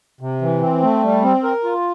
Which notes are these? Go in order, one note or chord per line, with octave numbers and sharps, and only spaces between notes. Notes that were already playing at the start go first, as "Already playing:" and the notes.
C3
E3
C4
A3
G3
C4
A#4
F4